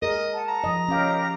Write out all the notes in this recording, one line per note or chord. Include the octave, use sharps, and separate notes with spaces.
G#4 A#4 D#5
F#5 A5
A#5
F3 D#5
C#4 G4 A#4 D#5 F5